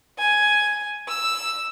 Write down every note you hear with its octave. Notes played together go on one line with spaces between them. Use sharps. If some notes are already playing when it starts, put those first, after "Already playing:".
G#5
E6